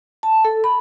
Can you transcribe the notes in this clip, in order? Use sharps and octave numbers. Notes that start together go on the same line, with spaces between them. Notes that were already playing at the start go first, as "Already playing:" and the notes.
A5
A4
B5